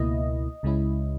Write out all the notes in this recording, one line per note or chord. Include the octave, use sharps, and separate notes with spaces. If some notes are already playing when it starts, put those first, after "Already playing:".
Already playing: C#2 B2 A#3 E4 D#5
C#2 C#3 G#3 C#4 E4